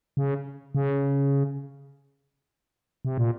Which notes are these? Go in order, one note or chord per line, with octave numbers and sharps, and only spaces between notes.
C#3
C#3
C3
A#2